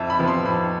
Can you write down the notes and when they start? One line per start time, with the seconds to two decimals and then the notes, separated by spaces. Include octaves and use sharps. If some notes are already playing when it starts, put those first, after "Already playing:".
Already playing: F2 E5
0.10 B5
0.19 C3 F3 B3
0.28 C6
0.45 F2 B5